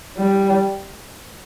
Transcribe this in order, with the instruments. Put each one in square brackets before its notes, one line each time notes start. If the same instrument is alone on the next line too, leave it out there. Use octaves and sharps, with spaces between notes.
[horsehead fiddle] G3